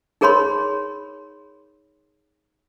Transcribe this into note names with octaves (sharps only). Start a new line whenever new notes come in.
D#4 G#4 A#4 C#5 B5 C6